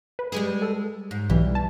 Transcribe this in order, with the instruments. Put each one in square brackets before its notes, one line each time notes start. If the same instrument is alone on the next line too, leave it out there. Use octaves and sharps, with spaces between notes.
[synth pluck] B4
[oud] G3 G#3 G#4
[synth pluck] A4
[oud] G#2
[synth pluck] B1 E3 [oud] G3
[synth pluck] A5